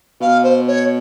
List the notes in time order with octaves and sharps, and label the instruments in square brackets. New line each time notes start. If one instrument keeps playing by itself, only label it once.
[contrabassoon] B2 [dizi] F5
[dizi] C5
C#5